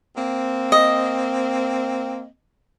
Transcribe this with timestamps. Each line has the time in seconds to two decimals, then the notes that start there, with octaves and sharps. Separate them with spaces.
0.17 A#3 C4
0.72 D#5